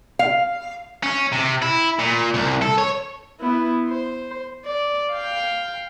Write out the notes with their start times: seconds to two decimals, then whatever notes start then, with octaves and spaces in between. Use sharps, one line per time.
0.19 F5
1.03 C#4
1.33 C3
1.62 E4
1.99 A#2
2.34 C2
2.62 A4
2.78 C#5
3.40 B3 E4
3.88 C5
4.65 D5
5.12 F5 G5